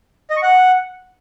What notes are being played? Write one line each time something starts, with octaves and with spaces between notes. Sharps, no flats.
D#5
C#6
F#5